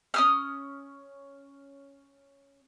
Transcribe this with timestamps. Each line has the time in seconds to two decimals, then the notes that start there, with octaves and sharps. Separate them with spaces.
0.14 C#4 D#6 F6